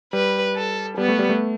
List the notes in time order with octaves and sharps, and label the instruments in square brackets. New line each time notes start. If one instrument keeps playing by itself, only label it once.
[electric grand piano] G3 [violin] B4
[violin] A4
[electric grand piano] G3 [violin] B3
[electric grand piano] A3
G3
A3